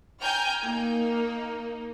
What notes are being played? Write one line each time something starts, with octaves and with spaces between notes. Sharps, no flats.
G5 G#5 A#5 F6 G6
A#3 D#4